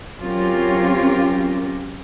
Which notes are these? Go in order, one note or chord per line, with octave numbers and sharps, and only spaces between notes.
F#3 C4 C#4 F4 G4 A#4